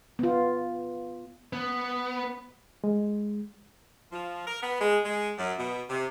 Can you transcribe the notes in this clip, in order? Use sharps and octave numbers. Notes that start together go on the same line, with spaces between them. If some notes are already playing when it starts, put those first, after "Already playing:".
B3 F4
B3
G#3
F3
A#4
B3
G#3
G#3
F#2
B2
C3